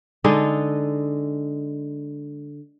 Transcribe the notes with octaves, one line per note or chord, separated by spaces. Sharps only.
D3 G#3 D#4 A4